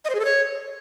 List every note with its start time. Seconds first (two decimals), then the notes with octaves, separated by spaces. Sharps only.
0.05 D#5
0.10 C5
0.15 G#4
0.20 A4
0.25 C#5